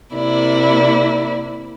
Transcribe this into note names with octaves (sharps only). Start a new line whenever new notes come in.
C3 A#3 E4 D5